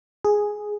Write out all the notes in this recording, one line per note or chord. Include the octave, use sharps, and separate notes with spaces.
G#4